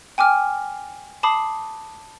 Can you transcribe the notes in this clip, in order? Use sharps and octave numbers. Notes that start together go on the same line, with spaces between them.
G5 G#5 D6 F6
A5 B5 D6 D#6 C7